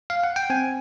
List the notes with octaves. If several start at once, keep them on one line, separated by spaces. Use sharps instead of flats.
F5
F#5
G5
C4 G#5